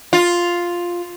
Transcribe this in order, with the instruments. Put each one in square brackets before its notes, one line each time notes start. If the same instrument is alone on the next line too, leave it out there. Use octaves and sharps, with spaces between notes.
[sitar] F4